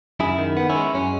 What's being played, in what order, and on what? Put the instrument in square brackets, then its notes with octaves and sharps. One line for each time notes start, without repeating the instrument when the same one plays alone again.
[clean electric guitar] F#2 E4 G#4
D#3
B3
C#4 E4
G#3
F#2 C#4